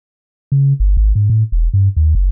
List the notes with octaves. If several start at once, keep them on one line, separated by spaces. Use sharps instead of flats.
C#3
G1
G#1
G#2
A2
E1
G2
D#2
F#1